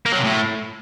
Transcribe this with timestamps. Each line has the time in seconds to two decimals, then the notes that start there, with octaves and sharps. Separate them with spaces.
0.06 A#3
0.12 F#3
0.18 C3
0.24 A2